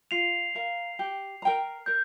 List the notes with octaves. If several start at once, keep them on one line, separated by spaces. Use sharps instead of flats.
F4 C7 F7
A#4 F5 A#5
G4
A#4 G5 A#5
A#4 G6